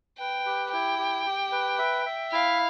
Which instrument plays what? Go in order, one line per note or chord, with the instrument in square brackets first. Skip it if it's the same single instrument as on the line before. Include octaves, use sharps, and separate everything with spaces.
[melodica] B4 [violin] G5
[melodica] G4
[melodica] E4 [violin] G5
[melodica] G4
G4
B4
E5
E5
[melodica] E4 [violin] F5